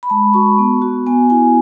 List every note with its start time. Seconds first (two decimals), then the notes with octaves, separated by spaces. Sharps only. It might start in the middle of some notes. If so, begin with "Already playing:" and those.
0.03 B5
0.10 G#3 A5
0.34 F#4 C#6
0.59 B3
0.82 F#4
1.07 B3 G#5
1.30 E4 G#5